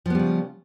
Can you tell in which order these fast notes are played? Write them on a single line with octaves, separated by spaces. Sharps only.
F3 B3 G3 C#3